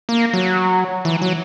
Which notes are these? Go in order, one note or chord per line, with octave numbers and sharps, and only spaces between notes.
A#3
F#3
E3
F#3